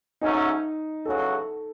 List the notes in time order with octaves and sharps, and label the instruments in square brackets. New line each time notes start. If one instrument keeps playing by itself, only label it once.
[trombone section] G#2 F#3 A3 C#4 [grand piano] D#4
[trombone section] E2 C#3 F#3 C#4 F#4 [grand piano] A4